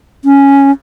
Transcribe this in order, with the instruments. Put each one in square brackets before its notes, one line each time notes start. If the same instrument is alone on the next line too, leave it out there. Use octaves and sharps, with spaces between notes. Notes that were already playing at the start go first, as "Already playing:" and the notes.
[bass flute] C#4